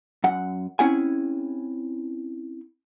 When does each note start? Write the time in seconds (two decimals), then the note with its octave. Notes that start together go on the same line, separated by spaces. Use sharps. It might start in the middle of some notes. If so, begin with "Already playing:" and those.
0.24 F#2 F#5
0.79 C4 C#4 E4 G#4 F#5 G#5